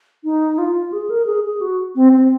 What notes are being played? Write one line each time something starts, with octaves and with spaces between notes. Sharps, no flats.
D#4
F4
G#4
A#4
G#4
G#4
F#4
C4
C4